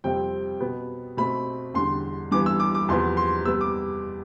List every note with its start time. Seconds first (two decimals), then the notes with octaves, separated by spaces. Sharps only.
0.04 F2 C3 G3 C4 G5
0.60 B2 B3
1.17 B2 A3 C4 B5
1.74 E2 D3 G3 C6
2.31 G2 E3 B3 D6
2.46 E6
2.60 D6
2.75 D6
2.88 E2 C3 F3 B3 C6
3.17 C6
3.45 C3 G3 B3 E6
3.61 D6